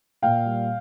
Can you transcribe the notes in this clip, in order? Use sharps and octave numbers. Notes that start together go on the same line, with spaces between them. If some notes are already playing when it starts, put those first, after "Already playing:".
A#2 F5 G5
G3